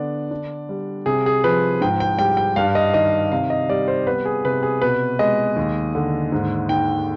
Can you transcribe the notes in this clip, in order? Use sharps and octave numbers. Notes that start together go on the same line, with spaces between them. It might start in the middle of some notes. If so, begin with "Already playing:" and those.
Already playing: D3 B3 D4 D5
D4
G3
C3 G#4
G#4
F3 B4
G#2 G5
G5
G3 G5
G5
G2 F5
D#5
D#3 D#5
C3 F5
D#5
G3 D5
C5
B3 B4
G#4
C3 B4
G#4
B2 B4
G#3 D#5
D#2
D3
G#2
D#3 G5